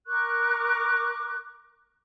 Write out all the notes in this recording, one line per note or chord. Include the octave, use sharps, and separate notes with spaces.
A#4 C#6 D6 F#6